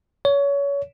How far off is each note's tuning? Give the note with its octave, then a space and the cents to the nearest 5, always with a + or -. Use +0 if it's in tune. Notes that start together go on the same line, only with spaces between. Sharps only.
C#5 +25